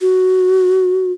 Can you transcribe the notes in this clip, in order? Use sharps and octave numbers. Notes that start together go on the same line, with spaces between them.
F#4